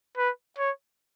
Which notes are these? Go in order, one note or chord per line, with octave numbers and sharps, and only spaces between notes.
B4
C#5